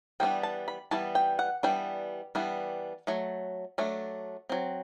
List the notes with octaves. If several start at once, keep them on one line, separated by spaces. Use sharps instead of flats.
E3 G3 B3 D4 G5
A5
B5
E3 G3 B3 A5
G5
F#5
E3 G3 B3 D4 G5
E3 G3 B3 D4
F#3 A3
F#3 A3 D4
F#3 C4